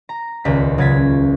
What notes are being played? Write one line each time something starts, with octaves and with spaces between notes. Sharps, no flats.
A#5
D#1 C#2 B6
C#3 F#3 G#6 A6 B6